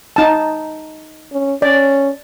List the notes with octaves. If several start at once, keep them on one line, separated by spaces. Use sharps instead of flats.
D#4 A5
C#4
C#4 D5